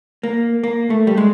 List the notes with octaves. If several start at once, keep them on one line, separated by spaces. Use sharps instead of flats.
A#3
A#3
A3
G3
G#3